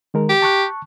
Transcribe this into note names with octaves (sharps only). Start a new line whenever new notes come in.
D#3 G#3 A#4
G4
A5 C#6 F#6